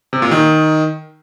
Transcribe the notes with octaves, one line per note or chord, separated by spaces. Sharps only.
C3
A#2
D#3